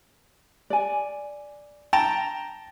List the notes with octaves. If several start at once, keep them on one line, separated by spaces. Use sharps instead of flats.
D5 G#5
G5 A5 A#5